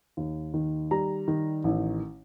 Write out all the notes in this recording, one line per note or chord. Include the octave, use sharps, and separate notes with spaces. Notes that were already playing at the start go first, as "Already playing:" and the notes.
D#2
D#3
G3 A#5
D#3
A1